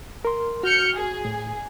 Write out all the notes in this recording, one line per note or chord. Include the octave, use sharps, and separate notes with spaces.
A#4 C6
F#4 F6 G6 C#7
G#4
A2